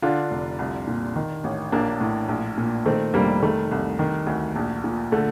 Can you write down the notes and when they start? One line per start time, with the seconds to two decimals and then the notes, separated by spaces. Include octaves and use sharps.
0.02 D3 D4 F4
0.31 F1
0.59 C2
0.87 A#2
1.16 D#3
1.44 A1
1.72 A#1 A#3 D4
2.01 A2
2.29 A#1
2.58 A#2
2.86 D#3 A3 C4
3.14 F1 G3 A#3
3.42 D#3 A3
3.71 C2
3.99 D#3
4.27 D2
4.56 A#1
4.84 A#2
5.12 D3 A3